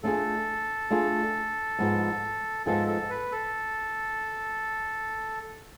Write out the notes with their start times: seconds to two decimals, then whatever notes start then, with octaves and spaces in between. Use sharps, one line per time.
0.03 A3 D4 F4 G#4 A4
0.90 A3 D4 F4 G#4
1.79 G#2 F3 B3 F4 G#4
2.66 G#2 F3 B3 F4 G#4 A4
2.87 A4
3.10 B4
3.32 A4